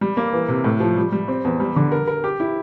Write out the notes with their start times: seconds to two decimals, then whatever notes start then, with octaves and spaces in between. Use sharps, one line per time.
0.01 G3
0.17 A#3
0.33 E3
0.48 C3
0.64 A2
0.80 F3
0.96 G3
1.12 G3
1.28 C4
1.44 E2
1.60 G3
1.76 D3
1.92 A#4
2.08 A#4
2.24 G4
2.40 E4